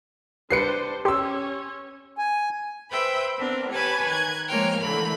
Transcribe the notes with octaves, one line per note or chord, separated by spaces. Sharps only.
G3 D4 B4 C5 C7 C#7
C#4 G4 C#5 C6 E6
G#5
B4 C5 E5 G5 B5
B3 C4 D4 A#4
G4 B4 C#5 G#5 A5 B5
D#3 F#6 G#6
F3 G#3 A#3 C#5 G5 F6
D3 E3 A3 A#3 B5